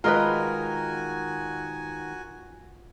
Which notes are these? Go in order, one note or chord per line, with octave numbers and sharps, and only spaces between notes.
D#3 G#3 F4 F#4 A#4 B4 D#5 G#5